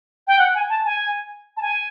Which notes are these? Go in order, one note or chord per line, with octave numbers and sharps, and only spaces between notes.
G5
F#5
G#5
A5
G#5
A5
G#5